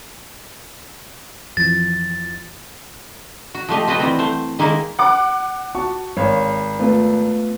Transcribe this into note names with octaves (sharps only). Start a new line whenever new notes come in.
F2 E3 F3 A6
F#4
F3 A3 G4 D#5
F4 F#4 B4 D#5 F#5 G5
E3 G3 B3 C4
A3 C5
D#3 G#3 A#3 E4 A#4
F#5 D6
F#4 A5 C#6
G#1 C#5 F5 C6
A3 B3 F4